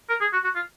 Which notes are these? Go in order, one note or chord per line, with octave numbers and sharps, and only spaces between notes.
A#4
G#4
F#4
F#4
F4